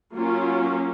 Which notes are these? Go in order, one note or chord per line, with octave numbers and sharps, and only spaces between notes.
F#3 A#3 C#4 F4